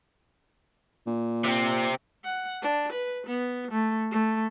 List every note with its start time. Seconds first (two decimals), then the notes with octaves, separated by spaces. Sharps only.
1.07 A#2
1.44 C3 C4
2.25 F#5
2.62 D4
2.92 B4
3.27 B3
3.71 A3
4.11 A3